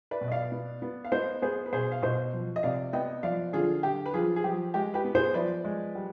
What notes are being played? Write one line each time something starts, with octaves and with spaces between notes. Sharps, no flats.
B4 D5
B2
D#5
D5 F5
B3
B3
F5
B3 C5 D#5
B3 G#4 C5
B4
B2 G#4 C5
F5
B2 C5 D#5
F3
D#5
C3 D5 F5
B3 D#5 G5
F3 D5 F5
D3 F4 G#4
D3 G4
B4
F3 F4 G#4
G#4
F3 G4
G#3 G4
G4 B4
B3
G#4 C5
F3 B4 D5
G#3
G3